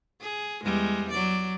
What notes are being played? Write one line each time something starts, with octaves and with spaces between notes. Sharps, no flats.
G#4
E2 G3 G#3
F#3 D5